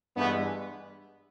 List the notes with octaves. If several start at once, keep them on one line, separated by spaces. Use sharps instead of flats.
G2 E3 G#3 A3 B3